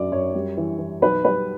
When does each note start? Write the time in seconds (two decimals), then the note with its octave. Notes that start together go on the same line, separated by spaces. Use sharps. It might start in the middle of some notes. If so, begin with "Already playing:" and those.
Already playing: F#2 F#3 D5
0.12 F#2 C#5
0.35 G3
0.57 E3
0.79 E3
1.01 B1 B4
1.25 G3 B4